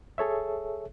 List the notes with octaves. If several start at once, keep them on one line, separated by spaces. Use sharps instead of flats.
G#4 A4 C#5 E5